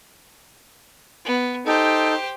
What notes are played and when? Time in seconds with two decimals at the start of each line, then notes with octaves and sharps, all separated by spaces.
1.25 B3
1.66 D#4 G4 A4 C5